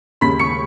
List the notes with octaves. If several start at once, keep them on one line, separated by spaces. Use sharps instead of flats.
D#2 C#3 G#3 B5 B6
C#6 C#7